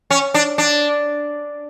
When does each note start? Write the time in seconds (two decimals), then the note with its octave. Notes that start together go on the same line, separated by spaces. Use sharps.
0.10 C#4
0.34 D4
0.58 D4